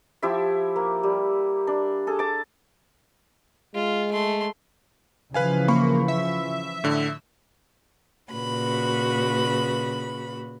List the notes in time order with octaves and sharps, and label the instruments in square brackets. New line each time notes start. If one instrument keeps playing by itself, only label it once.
[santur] F3 E4 G4 E5
A#3
G3
D4
G#4 A4
A5 D6
[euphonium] G#3 [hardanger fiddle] F4
[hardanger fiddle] A3 C6
[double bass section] C#3 E3 F3 [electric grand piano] B4 F5 G#5
[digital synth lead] A#3 [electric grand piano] B5 C#6
[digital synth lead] E5
[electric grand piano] A2 D3
[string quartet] A#2 C#3 F#4 B4 B5